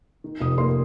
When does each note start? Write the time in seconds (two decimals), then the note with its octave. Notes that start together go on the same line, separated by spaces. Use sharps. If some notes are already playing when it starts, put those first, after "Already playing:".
0.24 D#3
0.41 F1 D#6
0.58 A#3 C6